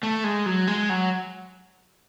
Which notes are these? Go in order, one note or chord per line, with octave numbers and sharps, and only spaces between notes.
A3
G#3
F#3
G#3
F#3